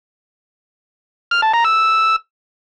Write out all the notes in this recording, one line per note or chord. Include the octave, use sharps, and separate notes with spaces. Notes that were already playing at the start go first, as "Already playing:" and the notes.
F6
A5
A#5
E6